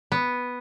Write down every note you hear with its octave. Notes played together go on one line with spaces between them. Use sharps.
B3